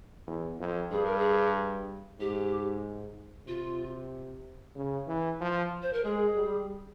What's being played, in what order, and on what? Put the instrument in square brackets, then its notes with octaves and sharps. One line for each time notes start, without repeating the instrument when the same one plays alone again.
[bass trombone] E2
F2
[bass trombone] G2 [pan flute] G#4
[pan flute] A#4
G#4
[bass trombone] G#2 [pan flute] G4
[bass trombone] C3 [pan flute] F4
[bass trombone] C#3
E3
F3
[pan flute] C5
A#4
[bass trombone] G#3 [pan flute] G#4
[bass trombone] G3